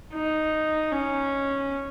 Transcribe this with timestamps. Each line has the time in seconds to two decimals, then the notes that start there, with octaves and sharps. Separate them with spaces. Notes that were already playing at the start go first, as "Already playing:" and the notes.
0.14 D#4
0.92 C#4